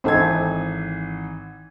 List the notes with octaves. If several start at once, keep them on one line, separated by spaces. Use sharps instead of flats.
G#1 E3 C4 D#4 A4 G#6